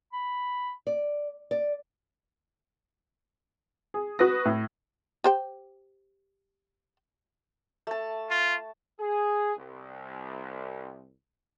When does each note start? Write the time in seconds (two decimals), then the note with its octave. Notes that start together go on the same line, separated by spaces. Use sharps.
0.13 B5
0.87 D5
1.51 D5
3.94 G#4
4.19 F#4 B4 D#6 A#6
4.45 A2
5.24 G4 C5 G5
7.87 A3 A5
8.28 F4
9.00 G#4
9.56 C2